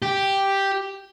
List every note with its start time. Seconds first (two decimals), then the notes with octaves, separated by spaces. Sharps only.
0.02 G4